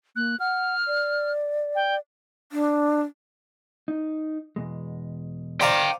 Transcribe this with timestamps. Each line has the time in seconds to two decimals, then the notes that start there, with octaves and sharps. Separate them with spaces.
0.16 A#3 F#6
0.40 F#5 F6
0.87 D5
1.75 G5
2.52 D4
3.88 D#4
4.56 E2 B2 G#3
5.61 C5 D5 F5 G5 A#5